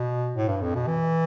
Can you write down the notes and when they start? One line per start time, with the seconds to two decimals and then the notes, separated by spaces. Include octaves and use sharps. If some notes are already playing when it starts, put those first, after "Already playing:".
Already playing: B2
0.36 A2
0.48 G2
0.61 F2
0.75 B2
0.87 E3